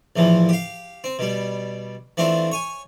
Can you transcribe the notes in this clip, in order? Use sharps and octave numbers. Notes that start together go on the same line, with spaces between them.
A#1 A2 E3 F3
G4 F5
C4
B2 G3
E3 A3 C4 D4 F4
C#5 G#5